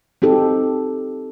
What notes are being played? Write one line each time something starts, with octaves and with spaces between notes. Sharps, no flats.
C4 D#4 G4 A4